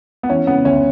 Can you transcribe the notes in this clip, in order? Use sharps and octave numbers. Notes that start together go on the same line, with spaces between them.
B3
E3 C#4
C#3 B3
D2 C#4